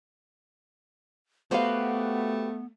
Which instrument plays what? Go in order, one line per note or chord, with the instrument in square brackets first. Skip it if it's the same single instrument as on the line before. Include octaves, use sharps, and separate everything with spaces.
[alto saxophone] A3 [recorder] B3 [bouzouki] F#4 G4 B4 [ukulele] C5 F5